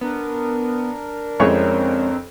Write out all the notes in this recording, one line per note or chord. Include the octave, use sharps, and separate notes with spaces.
B3 D4 A#4
F2 G#3 C4 C#4 E4 C#5 C#6